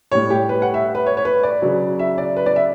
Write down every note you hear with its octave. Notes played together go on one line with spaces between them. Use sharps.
A2 G3 C#5
G4
B4
F#5
E5
B4
C#5
C#5
B4
D5
C#3 F#3
E5
D5
B4
D5
E5